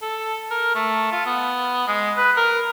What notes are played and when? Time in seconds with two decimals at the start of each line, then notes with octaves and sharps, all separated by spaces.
0.01 A4
0.50 A#4
0.75 A3
1.12 F4
1.26 B3
1.87 G#3
2.17 B4
2.37 A#4